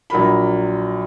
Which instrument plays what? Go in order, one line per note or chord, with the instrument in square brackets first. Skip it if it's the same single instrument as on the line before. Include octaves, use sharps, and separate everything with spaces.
[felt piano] A#1 F#3 A#4 B5